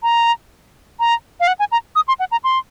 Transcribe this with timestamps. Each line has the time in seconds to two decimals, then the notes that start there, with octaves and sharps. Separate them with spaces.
0.03 A#5
0.99 A#5
1.40 F5
1.47 F#5
1.59 G#5
1.72 A#5
1.95 D#6
2.08 C6
2.19 F#5
2.31 A#5
2.44 C6